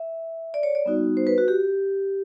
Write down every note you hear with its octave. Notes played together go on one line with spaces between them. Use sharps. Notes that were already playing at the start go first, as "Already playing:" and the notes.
Already playing: E5
D5
C#5
D5
G3 B3 D#4 F#4
C5
B4
F#4
G4